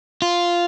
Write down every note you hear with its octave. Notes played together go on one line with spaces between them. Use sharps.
F4